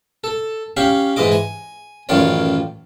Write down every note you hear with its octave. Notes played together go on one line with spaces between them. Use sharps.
A4
C#4 G4 F5 C#6
G#2 E3 G#3 D#5 D6
G#5
A1 F#2 D#3 F4 C#5 D5